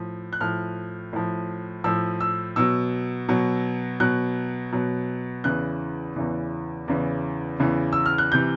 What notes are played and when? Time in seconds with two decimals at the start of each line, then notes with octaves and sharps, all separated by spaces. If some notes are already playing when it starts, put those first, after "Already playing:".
Already playing: A2 F3
0.33 F#6
0.40 A2 F3 F6
1.13 A2 F3
1.84 A2 F3 E6
2.21 E6
2.56 B2 F#3 E6
3.29 B2 F#3
4.00 B2 F#3 F#6
4.72 B2 F#3
5.44 E2 C#3 E3 F#6
6.16 E2 C#3 E3
6.88 E2 C#3 E3
7.60 E2 C#3 E3
7.93 E6
8.06 F6
8.18 F#6
8.32 C3 E3 G6